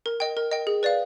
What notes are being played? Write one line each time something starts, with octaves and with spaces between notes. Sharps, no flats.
A#4
D#5 G5
A#4
D#5 G5
G#4
B4 D5 F5